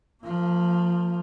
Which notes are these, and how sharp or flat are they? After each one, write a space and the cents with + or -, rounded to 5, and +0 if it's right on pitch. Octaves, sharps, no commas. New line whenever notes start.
F3 +0 A#3 -40